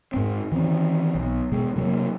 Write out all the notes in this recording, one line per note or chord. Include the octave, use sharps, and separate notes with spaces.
G#2 C4
D#3 E3 A#3 C4
B1
B2 G#3
C3 F#3 G#3 A#3